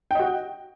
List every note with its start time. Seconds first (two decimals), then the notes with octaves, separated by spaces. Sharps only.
0.11 G5
0.15 D#5
0.19 F#4